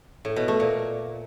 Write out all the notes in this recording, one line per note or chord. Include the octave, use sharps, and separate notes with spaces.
A2
B2
A3
A#2